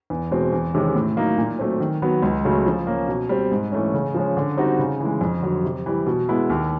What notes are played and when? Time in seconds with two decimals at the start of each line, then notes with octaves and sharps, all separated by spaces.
0.10 E2
0.31 B2 G#3 C4
0.53 E2
0.74 C3 D#3 G#3 C#4
0.95 A2
1.17 F#3 A#3 D#4
1.38 A#2
1.59 F#3 A3 C4
1.80 D#3
2.02 F#3 B3
2.23 C#2
2.45 C#3 F#3 A3
2.66 F3
2.87 A#3 C#4
3.08 B2
3.29 G3 C4
3.52 G#2
3.72 E3 A3 C#4
3.94 C#3
4.14 F3 G#3 C#4
4.37 D3
4.57 G3 C4 D#4 F#4
4.79 C#3
5.00 E3
5.05 G#3
5.21 F2
5.42 D3 F#3
5.64 C3
5.86 E3 G3
6.06 B2
6.29 G#3 B3 E4
6.50 D#2